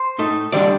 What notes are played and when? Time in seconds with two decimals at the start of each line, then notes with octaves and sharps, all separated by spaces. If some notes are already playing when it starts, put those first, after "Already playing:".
Already playing: C5
0.18 A2 A3 D#4
0.52 D#3 G3 D4 D5